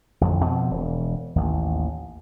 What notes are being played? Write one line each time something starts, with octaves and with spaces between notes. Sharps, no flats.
A1 F2 D3
B2 F3 C4
E1
A1 D#2